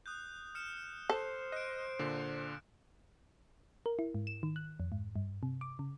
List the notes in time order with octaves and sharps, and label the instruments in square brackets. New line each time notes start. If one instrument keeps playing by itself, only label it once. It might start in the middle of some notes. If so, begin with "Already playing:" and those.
[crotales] D#6 F#6 G6
F6 C#7 E7
[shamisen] A4 [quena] C5
[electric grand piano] D#5 [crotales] F#6 D7
[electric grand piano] A#2 D3
[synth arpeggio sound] A#4
E4
G#2
E7
D#3
F#6
F2
G#2
G2
C3
D6
C#3